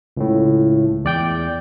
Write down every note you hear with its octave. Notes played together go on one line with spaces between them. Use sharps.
C#2 A2
E2 D5 G5 G6